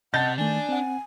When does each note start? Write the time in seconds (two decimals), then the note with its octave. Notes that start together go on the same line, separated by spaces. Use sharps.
0.14 C3 D#5 F#5 A5 G6 A6
0.38 D#3 A3 D4 G#5
0.69 C4 F#5